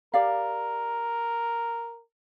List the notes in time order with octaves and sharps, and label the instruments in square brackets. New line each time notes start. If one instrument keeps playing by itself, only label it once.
[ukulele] G4 D5 F5 [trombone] A#4